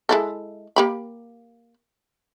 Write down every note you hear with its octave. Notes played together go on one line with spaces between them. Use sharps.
G#3 E4 A4
A#3 G4 B5